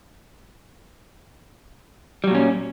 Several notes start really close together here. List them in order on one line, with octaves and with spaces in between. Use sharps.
G3 F#3 A#2 C#4